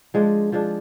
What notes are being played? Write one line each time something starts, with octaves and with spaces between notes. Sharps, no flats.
F3 G#3 D4
F3 G#3 D4